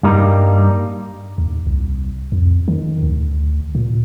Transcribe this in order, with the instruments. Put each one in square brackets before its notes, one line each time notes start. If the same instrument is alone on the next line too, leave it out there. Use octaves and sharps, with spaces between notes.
[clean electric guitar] G2 G3 A#3 D#4
[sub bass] D#2
C2
F2
D#3
D2
A#2